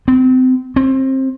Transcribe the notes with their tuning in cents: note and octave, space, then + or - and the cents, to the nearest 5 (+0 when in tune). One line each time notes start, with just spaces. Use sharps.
C4 -30
C4 +25